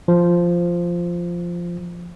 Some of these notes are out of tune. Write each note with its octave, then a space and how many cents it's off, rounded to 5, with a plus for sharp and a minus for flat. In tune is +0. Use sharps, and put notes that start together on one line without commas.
F3 -5